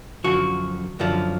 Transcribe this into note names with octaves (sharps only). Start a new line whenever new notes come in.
F#2 D3 F3 F#4
F#2 D3 F3